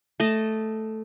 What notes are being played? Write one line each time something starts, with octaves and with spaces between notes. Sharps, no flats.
A3 D#5 A5